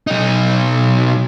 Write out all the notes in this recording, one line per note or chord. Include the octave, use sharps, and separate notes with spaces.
B1 D#4